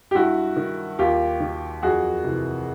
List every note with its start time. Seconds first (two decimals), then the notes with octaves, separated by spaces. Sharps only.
0.11 G4
0.15 G2 E4 F#4
0.56 D#3
0.99 D#2 F4 G4
1.40 D#3
1.83 F2 F#4 G#4
2.24 C3 E3